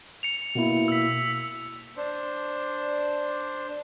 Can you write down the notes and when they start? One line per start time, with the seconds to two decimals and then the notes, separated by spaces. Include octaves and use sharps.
0.23 C#7 F7
0.55 B2 A#3 E4
0.88 E6 B6
1.97 D4 C5